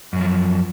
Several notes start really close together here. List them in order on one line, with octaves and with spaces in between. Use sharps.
F#2 F#3 F3